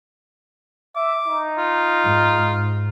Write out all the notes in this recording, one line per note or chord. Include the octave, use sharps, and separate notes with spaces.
E5 D6
D#4
F4
G#2